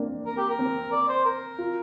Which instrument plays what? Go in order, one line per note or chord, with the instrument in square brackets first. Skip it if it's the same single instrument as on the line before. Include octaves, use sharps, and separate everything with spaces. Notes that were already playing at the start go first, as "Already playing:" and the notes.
Already playing: [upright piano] A#3 C4 D4
[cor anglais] A#4
G4
A#4
[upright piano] C4
[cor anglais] D5
C5
A#4
[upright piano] F4